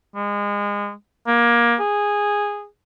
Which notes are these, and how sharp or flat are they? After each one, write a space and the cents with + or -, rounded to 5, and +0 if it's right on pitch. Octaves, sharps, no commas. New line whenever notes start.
G#3 -30
A#3 +20
G#4 -10